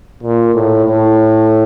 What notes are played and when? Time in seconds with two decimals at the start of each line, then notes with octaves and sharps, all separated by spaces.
0.23 A#2
0.55 A2
0.85 A2